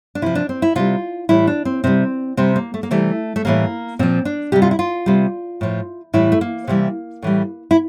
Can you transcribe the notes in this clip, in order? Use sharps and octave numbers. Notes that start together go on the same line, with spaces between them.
D4
C3 F3 E4
D4
C4
E4
C3 G3 F4
A2 E3 G3 E4
D4
C4
C3 G3 C4
C3 G3 C4
A#3
A3
A#3
C3 E3 G3 A3
A3
A2 E3 G3 A#3
A#2 F3 C4
D4
C3 G3 G4
F4
E4
F4
C3 G3
A2 F3
A2 E3 G3 E4
A3
A#3
C3 E3 G3
A2 E3 G3
E4